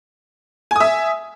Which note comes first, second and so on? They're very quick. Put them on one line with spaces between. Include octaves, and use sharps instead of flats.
G#5 D#6 E5